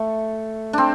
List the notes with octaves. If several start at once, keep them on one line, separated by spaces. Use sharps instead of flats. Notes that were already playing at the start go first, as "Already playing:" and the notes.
Already playing: A3
C4 D4